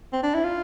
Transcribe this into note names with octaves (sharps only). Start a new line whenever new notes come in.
C4
D4
E4
F4